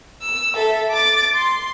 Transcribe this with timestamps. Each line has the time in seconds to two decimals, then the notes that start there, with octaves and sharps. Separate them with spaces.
0.22 E6
0.55 A4 E5
0.90 D6 A6
1.35 C6